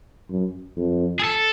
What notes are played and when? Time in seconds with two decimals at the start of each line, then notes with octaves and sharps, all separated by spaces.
0.30 F#2
0.77 F2
1.20 G#4
1.24 A4